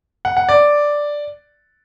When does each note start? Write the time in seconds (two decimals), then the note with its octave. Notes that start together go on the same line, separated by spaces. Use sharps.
0.25 F#5
0.37 F#5
0.49 D5